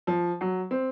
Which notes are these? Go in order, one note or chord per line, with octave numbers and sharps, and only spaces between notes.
F3
F#3
C4